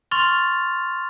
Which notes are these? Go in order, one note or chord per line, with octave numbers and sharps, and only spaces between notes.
C6 C#6 F6 A6 F7